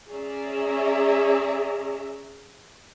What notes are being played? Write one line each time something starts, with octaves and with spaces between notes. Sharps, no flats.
C#4 G#4 D5 E5 A#5